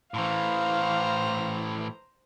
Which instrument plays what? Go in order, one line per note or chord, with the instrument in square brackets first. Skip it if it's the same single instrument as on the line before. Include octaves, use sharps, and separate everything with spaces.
[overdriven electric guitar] A2 E3 [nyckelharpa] C5 A#5 [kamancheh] F5